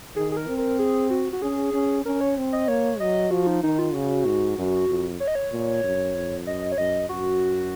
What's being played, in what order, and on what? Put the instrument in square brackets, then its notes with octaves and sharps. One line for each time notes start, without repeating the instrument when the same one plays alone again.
[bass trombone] D#3 [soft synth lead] G#4
[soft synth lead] G#4
A#4
[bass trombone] C4
[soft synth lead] A#4
G#4
F#4
F#4
[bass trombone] C#4 [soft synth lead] G#4
[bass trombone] C#4
[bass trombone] C#4 [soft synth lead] A#4
[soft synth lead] C#5
[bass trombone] C4
[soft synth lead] D#5
[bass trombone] A#3 [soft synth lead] C#5
[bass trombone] F#3 [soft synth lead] D#5
[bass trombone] F3 [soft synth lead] F#4
[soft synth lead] D#4
[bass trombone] D#3 [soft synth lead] D#4
[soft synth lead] F4
[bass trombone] C#3 [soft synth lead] F#4
[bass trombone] G#2
F#2
F2
[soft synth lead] C#5
D#5
C#5
[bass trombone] A#2
F#2
F2
[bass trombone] F#2 [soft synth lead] D#5
[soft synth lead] C#5
[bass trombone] F#2 [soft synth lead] D#5
[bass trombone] F#2 [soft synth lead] F#4